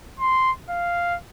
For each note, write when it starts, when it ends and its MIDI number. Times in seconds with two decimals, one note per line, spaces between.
0.20 0.51 84
0.69 1.16 77